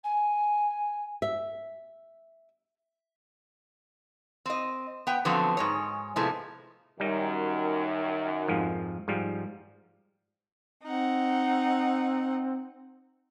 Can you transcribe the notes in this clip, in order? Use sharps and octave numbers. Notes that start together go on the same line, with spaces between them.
G#5
E5
C4 D#5
B3 G5
D3 F3 F#3 A3 B3 C4
G#2 G#3 C#5
A2 C3 F3 G#3 A3 B3
F#2 D#3 G3 D#4
F2 G#2 F3
G#2 F3 G3
C4 D#4 F#5